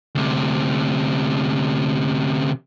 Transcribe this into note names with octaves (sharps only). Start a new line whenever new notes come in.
D2 C3